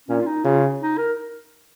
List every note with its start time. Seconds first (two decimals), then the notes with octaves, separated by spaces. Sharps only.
0.08 A#2 C#4
0.20 F4
0.26 D#4
0.44 C#3 F4
0.80 D#4
0.98 A#4